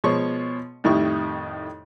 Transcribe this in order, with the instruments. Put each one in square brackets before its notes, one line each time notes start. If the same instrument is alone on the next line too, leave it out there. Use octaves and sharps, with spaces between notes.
[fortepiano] B2 F3 G#3 C#5 C#6
F2 A2 D#3 G3 E4 C#6